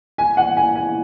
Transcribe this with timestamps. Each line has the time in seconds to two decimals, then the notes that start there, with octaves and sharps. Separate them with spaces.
0.18 G#5
0.37 F#5
0.57 G#5
0.75 G#5